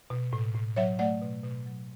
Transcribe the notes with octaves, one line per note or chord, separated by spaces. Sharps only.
B2
A2
A2
F#3 C#5 E5
A3 D5 F#5
B2
B2
F#3